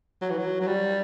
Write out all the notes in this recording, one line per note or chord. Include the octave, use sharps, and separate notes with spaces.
F#3
E3
F#3
F#3
G3